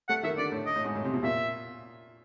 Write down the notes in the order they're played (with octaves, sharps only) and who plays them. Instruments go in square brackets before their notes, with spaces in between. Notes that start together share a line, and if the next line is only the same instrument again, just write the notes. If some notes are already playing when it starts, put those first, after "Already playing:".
[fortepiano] A3 [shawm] F#5
[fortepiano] D#3 [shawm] E5
[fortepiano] D3 [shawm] D5
[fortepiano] A2
[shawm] D#5
[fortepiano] A2
G#2
A2
C3
B2
[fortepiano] A#2 [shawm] E5